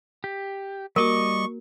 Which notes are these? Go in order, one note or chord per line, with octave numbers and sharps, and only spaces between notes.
G4
G3 A#3 F#4 A#4 D#5 C#6 D6